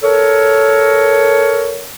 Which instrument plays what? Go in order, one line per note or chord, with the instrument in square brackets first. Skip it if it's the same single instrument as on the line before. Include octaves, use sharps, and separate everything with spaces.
[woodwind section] A4 A#4 C#5